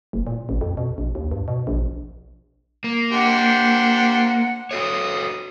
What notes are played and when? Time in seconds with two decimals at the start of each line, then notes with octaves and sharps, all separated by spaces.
0.13 F#1
0.27 A#2
0.49 A1
0.61 F2
0.77 B2
0.98 A#1
1.15 D#2
1.31 G2
1.48 B2
1.67 A#1
2.84 A#3
3.12 D4 G4 C5 F#5
4.71 F#4 A4 C#5 D#6